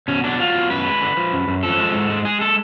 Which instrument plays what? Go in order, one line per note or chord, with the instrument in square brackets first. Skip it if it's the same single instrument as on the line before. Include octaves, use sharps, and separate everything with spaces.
[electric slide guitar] B2 C#4
F#3 D4
F#3 F4
B2
F#2 B4
G#3
D3
F3
F#2
F#2
F3 A4
G#3
G#2
G#3
G#3 G#4
A4